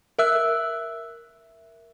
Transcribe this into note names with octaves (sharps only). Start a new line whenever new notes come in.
A#4 E5 E6 F#6